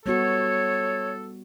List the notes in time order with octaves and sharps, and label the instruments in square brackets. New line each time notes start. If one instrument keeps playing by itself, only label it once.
[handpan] G3 B3 F#4 [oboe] A4 [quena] C#5